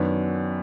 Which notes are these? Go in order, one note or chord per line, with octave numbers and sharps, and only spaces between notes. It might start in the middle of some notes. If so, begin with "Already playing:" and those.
Already playing: F#2 D#3 F#3 B3 D4